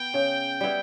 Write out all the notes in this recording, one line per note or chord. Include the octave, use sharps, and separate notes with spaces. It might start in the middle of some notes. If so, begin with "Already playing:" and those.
Already playing: B3 G5
C#3
G3 B3 E4